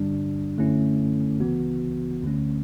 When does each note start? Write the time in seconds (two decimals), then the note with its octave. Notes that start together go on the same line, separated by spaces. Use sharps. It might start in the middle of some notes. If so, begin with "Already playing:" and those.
Already playing: G2 D3 G3 D4
0.57 F#2 D3 A3 C#4 E4
1.40 C#2 C#3 E3 B3 F#4
2.23 D2 D3 A3 C#4